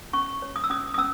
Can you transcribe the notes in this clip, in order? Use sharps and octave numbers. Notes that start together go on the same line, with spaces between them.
C#4 C#6
C#5
D#6
E6
C#4 D#6
D#6
C#4 E6